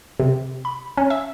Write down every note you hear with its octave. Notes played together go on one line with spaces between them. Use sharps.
C3
B5
C#4
E5